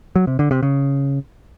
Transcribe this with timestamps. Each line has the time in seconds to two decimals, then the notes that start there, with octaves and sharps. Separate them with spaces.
0.16 F#3
0.27 C3
0.39 D3
0.51 C3
0.63 C#3